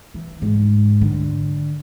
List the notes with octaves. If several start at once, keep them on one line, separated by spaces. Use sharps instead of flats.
E3
G#2
D3